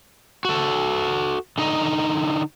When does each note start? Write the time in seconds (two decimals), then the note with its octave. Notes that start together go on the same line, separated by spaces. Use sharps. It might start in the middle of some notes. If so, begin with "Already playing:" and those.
0.45 F#4 A4
1.58 D3 D#4 D#5